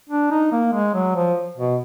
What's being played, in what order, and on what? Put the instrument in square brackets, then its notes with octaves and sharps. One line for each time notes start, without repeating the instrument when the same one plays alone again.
[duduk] D4
D#4
A#3
G#3
F#3
F3
B2